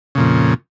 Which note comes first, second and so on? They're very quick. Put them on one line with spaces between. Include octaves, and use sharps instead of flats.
C#3 A#2 F2